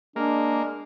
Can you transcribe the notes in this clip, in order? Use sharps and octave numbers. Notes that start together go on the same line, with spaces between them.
G#3 A#3 D4